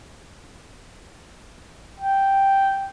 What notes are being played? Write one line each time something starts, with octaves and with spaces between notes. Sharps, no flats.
G5